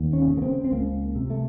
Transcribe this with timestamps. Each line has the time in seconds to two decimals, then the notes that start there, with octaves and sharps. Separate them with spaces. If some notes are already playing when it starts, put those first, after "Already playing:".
Already playing: D#2
0.13 C#4
0.28 C#3
0.38 A#3
0.42 C4
0.64 C4
0.72 C#2 A#3
1.16 C3
1.30 A3